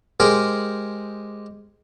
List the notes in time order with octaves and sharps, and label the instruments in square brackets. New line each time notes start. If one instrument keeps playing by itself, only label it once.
[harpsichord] G#3 G4 G#4 A#4 C5